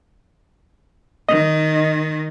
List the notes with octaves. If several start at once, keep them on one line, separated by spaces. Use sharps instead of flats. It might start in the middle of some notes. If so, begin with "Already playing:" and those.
D#3 D#5